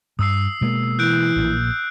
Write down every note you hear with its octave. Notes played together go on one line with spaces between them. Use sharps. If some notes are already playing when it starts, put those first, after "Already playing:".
G2 D#6 E6 C7
B2 G#3 A#3
E3 F#6 G6 D7
A#1 A#2